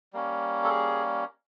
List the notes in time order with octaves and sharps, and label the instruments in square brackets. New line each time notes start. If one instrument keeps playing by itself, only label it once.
[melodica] G3 A#3 C#4
A4
G#4